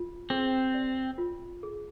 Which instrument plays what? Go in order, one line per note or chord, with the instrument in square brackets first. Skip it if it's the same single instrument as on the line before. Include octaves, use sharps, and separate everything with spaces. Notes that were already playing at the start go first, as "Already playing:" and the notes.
Already playing: [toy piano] F4
[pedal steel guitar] C4 [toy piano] G#4
[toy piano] D5
F4
G#4